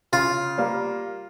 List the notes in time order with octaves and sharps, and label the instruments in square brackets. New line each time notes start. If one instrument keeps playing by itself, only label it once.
[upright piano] C#3 [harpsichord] F4
[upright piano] G3 A#3